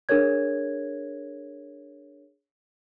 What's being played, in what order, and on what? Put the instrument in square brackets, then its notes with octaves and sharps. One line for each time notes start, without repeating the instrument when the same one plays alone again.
[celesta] D4 G#4 A#4 C#5 G#6